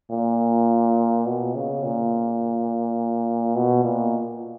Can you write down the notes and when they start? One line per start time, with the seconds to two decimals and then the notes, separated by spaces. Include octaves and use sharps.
0.12 A#2
1.26 B2
1.55 C#3
1.83 A#2
3.56 B2
3.84 A#2